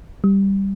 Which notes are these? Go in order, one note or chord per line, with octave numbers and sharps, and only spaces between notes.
G3